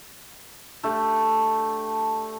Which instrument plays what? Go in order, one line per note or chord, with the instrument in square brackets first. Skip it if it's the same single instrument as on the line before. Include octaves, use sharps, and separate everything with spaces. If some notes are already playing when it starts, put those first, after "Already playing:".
[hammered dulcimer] A3 D4 G4 A4